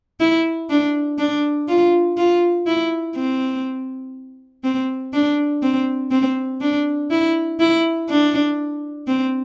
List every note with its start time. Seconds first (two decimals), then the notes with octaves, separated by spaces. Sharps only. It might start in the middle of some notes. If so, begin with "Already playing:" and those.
0.20 E4
0.70 D4
1.18 D4
1.68 F4
2.17 F4
2.67 E4
3.16 C4
4.64 C4
5.13 D4
5.62 C4
6.11 C4
6.61 D4
7.11 E4
7.60 E4
8.09 D4
9.07 C4